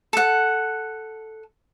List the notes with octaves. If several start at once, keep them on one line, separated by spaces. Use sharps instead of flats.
A4 F#5